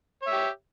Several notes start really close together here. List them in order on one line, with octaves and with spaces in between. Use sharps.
C#5 E5 G4